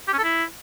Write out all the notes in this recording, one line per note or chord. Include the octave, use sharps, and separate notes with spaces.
G4
C#4
A4
E4